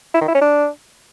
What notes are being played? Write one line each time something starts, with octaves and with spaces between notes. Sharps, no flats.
E4
D#3
E4
C#4
D4